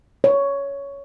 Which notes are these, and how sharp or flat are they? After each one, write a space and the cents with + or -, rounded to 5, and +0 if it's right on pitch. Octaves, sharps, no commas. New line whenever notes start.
C#5 +10